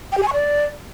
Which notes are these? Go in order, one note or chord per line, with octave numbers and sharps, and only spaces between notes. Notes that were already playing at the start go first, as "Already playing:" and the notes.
G5
G4
G#5
C#6
D5